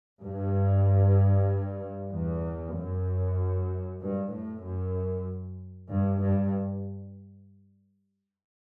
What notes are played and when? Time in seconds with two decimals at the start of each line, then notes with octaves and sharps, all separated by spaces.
0.23 G2
2.11 E2
2.74 F#2
3.99 G2
4.31 A2
4.63 F#2
5.89 G2
6.20 G2